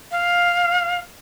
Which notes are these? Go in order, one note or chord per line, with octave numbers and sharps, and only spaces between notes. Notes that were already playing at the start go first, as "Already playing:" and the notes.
F5